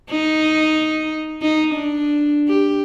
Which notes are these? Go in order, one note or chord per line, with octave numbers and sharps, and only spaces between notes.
D#4
D#4
D4
G4